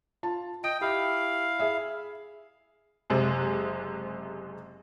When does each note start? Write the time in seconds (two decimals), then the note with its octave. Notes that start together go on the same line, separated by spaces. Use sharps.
0.23 F4 A5
0.64 D#5 G5 D7
0.81 E4 G4 F5
1.59 G#4 E5
3.10 F#1 C3 G#3 G#4